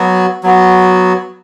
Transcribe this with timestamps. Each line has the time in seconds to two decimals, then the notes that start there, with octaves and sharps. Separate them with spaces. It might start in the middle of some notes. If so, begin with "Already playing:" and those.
Already playing: F#3 B3 F#4
0.43 F#3 B3 F#4